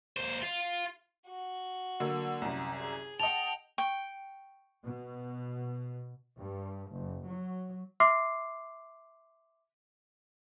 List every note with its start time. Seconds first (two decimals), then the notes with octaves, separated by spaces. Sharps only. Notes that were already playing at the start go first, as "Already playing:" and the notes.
0.17 D#2 C5
0.42 F4
1.27 F#4
2.00 D3 F#3 A#3
2.42 C2 F#2
2.75 G#4
3.20 D#5 F#5 G5 A5 F7
3.78 G5 C#6
4.84 B2
6.38 G2
6.93 F#1
7.27 F#3
8.00 E5 C6 D6 F6 C7